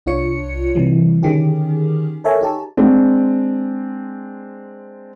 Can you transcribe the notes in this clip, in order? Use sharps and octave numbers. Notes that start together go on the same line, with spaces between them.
C2 D4 F4 C#5 C#7
C3 E3 G3
D3 D#3 C#4 G4 G#4
A4 A#4 C#5 E5 G#5 A#5
D#4 G4 A5
G#3 C4 D4